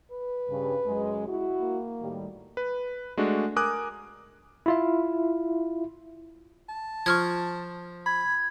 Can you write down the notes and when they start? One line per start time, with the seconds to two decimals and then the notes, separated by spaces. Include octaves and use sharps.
0.11 B4
0.49 G2 C#3
0.86 F#2 G#3
1.28 E4 F#4
1.61 A#3
2.01 A2 D#3 G3
2.57 B4
3.17 G#3 A3 D4 F#4
3.56 A#4 G#5 D6 D#6 F#6
4.66 E4 F4 E5
6.69 A5
7.06 F3 C#6 F6 G#6
8.06 B5 G#6